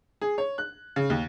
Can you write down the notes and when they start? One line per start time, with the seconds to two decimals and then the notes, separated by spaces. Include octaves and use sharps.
0.22 G#4
0.38 C#5
0.58 F#6
0.96 C#3
1.10 D#2